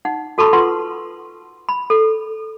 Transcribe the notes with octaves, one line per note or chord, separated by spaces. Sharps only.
D#4 F#5
F#4 A4 A5 B5 C#6 E6
F4 A4 B4 F#5 C6
B5
A4